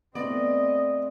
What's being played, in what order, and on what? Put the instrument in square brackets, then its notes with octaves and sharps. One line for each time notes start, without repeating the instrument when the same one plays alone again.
[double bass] A3 C4 [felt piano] B3 [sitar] D5 [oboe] D#5